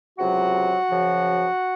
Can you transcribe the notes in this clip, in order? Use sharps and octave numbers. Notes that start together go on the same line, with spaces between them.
C#2 C3 F#3 F#4 F#5
F#2 C#3 F3